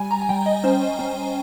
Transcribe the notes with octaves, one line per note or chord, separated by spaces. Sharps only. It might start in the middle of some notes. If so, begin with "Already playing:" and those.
Already playing: G3 G#5
A#5
G#5
G3 G5
D#5
C#4 C5
C#4